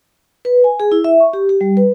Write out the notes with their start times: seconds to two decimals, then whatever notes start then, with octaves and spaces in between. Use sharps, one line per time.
0.45 B4
0.64 G#5
0.80 G#4
0.92 E4
1.04 E5
1.20 C#6
1.33 G4
1.49 G4
1.61 G3
1.77 B4